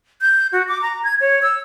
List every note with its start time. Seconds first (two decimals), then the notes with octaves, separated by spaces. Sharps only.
0.21 G6
0.53 F#4
0.68 D6
0.82 A#5
1.04 G#6
1.21 C#5
1.42 E6